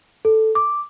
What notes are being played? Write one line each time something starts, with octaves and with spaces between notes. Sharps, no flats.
A4
D6